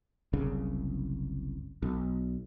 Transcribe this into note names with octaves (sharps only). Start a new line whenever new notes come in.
F#1 C2 C#3
B1